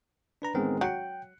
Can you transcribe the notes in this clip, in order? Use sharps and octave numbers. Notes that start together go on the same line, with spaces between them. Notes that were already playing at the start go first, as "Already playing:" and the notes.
D4 B4 A#5
A1 D#3 G#3 B3 C4 A#4
F#3 G5 F#6 C#7